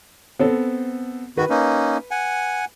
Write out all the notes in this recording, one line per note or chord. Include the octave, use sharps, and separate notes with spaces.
B3 C4 A4
D#3 F#4 B4
A#3 C#4 D#4
F#5 G#5